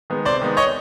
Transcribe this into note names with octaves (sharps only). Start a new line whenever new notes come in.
D#3 G#3 B3
C3 C5 D5
D#3 G#3 B3
C#5 D#5